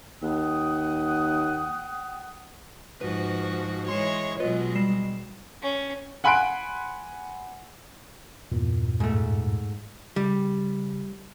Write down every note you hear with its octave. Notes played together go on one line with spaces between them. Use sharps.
D#2 F#5 G5 D#6
G#2 F3 F#4 B4
E3 G#3 C#5 C6 C7 E7
B2 F#3 G#3 F4 B4 D#5
G3 C7 E7
C#4
F#5 G#5 B5 C6 F#6 D7
E2 G2 A#2
G#2 A3
C#3 G3